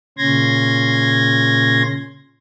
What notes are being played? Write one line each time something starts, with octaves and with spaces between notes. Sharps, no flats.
A#2 C#3 C#4 C6 G#6 A#6